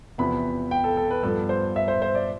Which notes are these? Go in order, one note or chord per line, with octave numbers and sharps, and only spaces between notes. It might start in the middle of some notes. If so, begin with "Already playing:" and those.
E2 C3 F3 B3 B5
G5
A4
A4
B4
G2 F3 B3 A4
C5
E5
C5
C5
D5